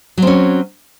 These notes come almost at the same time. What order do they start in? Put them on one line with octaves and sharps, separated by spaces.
F#3 C4 C#4